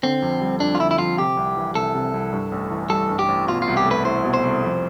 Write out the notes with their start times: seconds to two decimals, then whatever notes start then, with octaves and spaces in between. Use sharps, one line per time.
0.03 D3 C4
0.22 F2
0.41 G3
0.60 F2 D4
0.75 F4
0.80 D3 E4
0.91 E4
0.98 F2 F4
1.18 C3 G4
1.37 C2
1.57 E3
1.75 C2 A4
1.95 C3
2.14 C2
2.33 G2
2.52 A1
2.71 E3
2.90 G3 A4
3.09 G2
3.19 G4
3.28 A1
3.47 B2 F4
3.62 F4
3.68 C2
3.77 G4
3.86 A3
3.91 B4
4.05 E4 C5
4.24 B2
4.34 C5
4.44 C2
4.64 F2